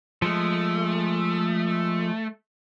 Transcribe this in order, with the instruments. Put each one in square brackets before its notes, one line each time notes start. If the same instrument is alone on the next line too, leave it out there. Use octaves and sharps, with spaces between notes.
[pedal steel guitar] F3 G#3 [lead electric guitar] A3